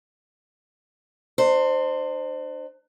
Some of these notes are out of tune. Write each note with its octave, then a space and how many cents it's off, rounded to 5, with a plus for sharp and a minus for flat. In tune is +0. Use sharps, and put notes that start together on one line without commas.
D4 +40 C5 +0